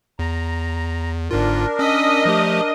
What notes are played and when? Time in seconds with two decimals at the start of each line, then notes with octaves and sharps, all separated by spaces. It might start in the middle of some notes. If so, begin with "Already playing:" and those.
0.19 E2 A#5
1.31 G1 G#2 D4 F4 A#4
1.79 C#4 D#5 E6 B6
2.25 F3 A3 G4